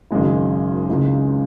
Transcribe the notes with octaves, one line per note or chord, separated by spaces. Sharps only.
G#1 F#2 C#3 G#3 E4
C#2 C#3 G#3 E4